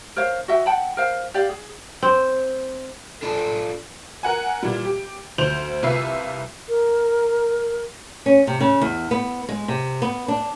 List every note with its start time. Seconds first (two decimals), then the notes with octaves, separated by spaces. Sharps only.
0.16 A#4 C5 C#5 F5
0.48 F#4 D#5 E5 G5
0.66 F#5 G5 A5 B5
0.97 A#4 C5 F5
1.34 G4 D5 F5
1.49 G#4
2.03 C4
3.23 D4 F4 A4 D5
4.23 A#4 F#5 G#5
4.63 A#2 E3 G3
4.85 G4
5.38 D2 C5 G6 F7
5.82 C2 F4 B4 E5 C7
6.69 A#4
8.26 C#4
8.47 C3
8.61 C#3
8.81 E2
9.11 B3
9.49 G#3
9.68 C3
10.02 B3
10.28 D4